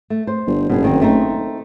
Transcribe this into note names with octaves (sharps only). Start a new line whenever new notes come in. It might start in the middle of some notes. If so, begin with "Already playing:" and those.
A3
C5
G1
F#1 B2 G#4
D3 D#3 C4
A3 C4 D#4